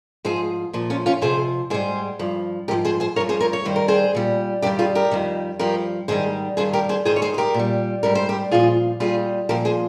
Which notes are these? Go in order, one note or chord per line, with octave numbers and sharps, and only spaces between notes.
G#2 F3 G#4 C5
A#2 F3
C#4 F4
C#4 F4
F2 C3 F3 G#4 C5
G#2 G3 G#4 C5
G2 F3
G#2 F3 G4 A#4
G#4 C5
G#4 C5
G2 F3 A#4 C#5
G#4 C5
A#4 C#5
C#5
G2 D#3 G3 C5
A#4
G#4 C5
A#2 G3
G2 D#3 G3 G4 A#4
F4 G#4
G4 A#4
F2 D#3 G3
G2 F3 G4 A#4
G#2 D#3 G3 G#4 C5
G2 D#3 G3 G#4 C5
G4 A#4
G#4 C5
G#2 D#3 G3 G#4 C5
C#5
G#4 C5
C5
G4 A#4
A#2
G3
G#2 G3 A#4
C5
G4 A#4
A#2 F3 F4 G#4
A#2 G3 F4 G#4
A#2 F3 G4 A#4
G#4 C5